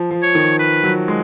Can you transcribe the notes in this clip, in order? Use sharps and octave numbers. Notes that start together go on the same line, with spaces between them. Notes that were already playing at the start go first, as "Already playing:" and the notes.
Already playing: F3
F3
C#5
D#3
B4
F#3
G#3